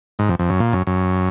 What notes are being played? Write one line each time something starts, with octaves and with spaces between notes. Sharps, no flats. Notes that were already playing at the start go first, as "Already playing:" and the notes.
G#2
F2
F2
F#2
A#2
F#2
F#2